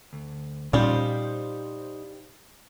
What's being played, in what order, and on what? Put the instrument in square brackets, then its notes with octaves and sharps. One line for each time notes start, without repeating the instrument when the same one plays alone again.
[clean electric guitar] D2
[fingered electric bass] A#2 C#4 [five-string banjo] F3 G3 [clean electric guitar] D#4 G4 C5